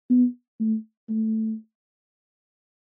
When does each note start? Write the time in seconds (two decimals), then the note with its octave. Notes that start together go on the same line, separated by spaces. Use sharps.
0.10 B3
0.60 A3
1.09 A3